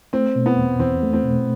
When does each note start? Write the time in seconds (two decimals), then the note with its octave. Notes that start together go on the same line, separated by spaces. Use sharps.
0.13 A3 C4
0.36 B2
0.46 B3
0.58 E2
0.80 E2 C4
1.03 A3
1.13 C4
1.24 B2